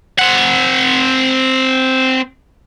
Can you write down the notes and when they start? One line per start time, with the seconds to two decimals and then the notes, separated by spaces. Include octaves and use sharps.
0.19 C4 F#5